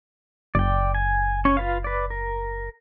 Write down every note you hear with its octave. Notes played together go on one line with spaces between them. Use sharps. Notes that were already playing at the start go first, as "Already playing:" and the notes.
F#1 D5 G5
G#5
C#4 C#5
F4 B4 F5
B4 D5
A#4